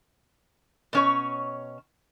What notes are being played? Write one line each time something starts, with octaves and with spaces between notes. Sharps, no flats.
B2 C#4 C#5